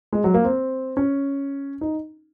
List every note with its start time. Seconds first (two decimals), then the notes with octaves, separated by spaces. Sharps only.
0.13 G#3
0.24 F#3
0.34 A#3
0.44 C4
0.97 C#4
1.81 D#4